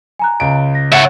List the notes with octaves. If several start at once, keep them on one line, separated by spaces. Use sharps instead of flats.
G#5 A#5 F#6
C#2 D7
A#6
C#5 E5 F#5